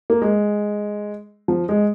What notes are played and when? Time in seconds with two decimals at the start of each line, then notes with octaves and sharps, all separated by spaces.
0.10 A#3
0.22 G#3
1.48 F3
1.69 G#3